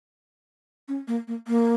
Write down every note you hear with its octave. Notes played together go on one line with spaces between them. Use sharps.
C#4
A#3
A#3
A#3